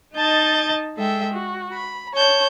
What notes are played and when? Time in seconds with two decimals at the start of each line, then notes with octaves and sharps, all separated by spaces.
0.14 D#4 D#5 A5 G6 A6
0.96 G#3 A4 E5 G5
1.33 F#4
1.73 B5
2.13 C#5 A5 G6